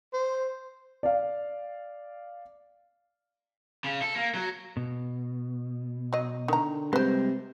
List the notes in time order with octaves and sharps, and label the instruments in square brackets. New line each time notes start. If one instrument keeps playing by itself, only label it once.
[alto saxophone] C5
[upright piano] D5 F5
[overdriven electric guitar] C#3
A4
A#3
F#3
[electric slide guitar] B2
[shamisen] F#3 D#5
[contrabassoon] D3 [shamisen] D#3 A#5
[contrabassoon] C3 [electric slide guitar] G3 G#3 [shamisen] B4 C5